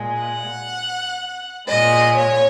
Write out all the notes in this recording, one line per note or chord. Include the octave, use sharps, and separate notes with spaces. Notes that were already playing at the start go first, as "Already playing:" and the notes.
Already playing: A#2 G#3
F#5
A#2 G#3 D#5
C#5